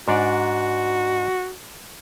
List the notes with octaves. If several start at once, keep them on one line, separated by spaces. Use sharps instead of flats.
G#2 D4 F#4 D5